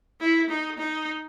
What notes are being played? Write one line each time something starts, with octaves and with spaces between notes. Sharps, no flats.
E4
D#4
D#4